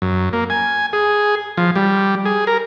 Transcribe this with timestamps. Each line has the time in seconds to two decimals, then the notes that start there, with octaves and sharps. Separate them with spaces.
0.02 F#2
0.33 A#3
0.50 G#5
0.93 G#4
1.57 F3
1.76 G3
2.25 G#4
2.47 A#4